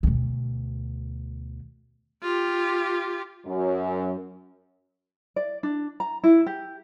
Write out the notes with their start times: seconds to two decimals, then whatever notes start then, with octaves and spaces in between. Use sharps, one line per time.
0.03 D2 B2
2.23 F4 G4
3.46 F#2
5.36 D5
5.63 D4
6.00 A#5
6.24 E4
6.46 G4